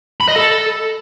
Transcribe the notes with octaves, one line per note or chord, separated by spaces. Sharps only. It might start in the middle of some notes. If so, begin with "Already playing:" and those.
B5
D#5
A4